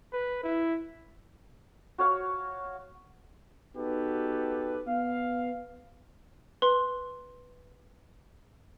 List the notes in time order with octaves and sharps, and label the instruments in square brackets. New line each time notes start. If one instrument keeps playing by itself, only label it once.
[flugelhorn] B4
E4
[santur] F#4 C#5 F5
[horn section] B3 D#4 F#4 G4 A4 B4
B3 F5
[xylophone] B4 C6